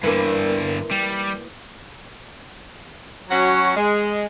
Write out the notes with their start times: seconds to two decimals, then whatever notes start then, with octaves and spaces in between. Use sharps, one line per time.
0.04 G2 D3 E3 A#3
0.91 G3
3.29 F#3 C#4 F#4
3.76 G#3